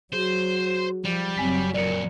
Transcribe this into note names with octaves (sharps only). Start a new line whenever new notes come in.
F#3 F#4 G#4 C5
F3 G3
F#1 F#3 C4 G#5 B6
F2 A#2 A#4 D5 C#7